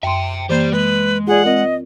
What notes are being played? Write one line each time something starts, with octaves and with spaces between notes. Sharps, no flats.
F#2 E5 G5 C6
E3 A#3 G4 C5 D5
G#3 B4
F4 G#4 D5 F#5
C4 F4 A#4 D#5